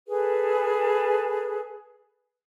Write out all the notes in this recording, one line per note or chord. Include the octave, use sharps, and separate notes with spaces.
G#4 A4 B4